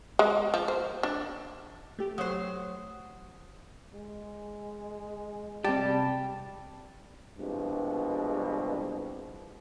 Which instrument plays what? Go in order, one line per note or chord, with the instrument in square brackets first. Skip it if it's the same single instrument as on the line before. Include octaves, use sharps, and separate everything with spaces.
[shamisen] G#3
F3
C5
D4
[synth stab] A3 G4
[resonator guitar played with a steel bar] F#3 C5 [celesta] C#5 D#6
[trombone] G#3
[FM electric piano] C3 A5 [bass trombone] G3 [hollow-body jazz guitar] G4
[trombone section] C2 G2 B2 F3 G#3